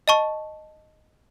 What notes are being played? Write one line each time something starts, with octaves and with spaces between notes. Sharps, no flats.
D#5 A5 C#6